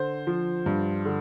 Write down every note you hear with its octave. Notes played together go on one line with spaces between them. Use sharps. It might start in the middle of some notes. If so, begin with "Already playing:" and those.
Already playing: D3 C5
F3
G2
D3